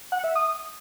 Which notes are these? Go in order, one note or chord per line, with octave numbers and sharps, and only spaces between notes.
F#5
E5
D#6